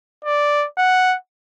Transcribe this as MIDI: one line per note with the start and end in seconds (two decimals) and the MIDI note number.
0.25 0.66 74
0.78 1.15 78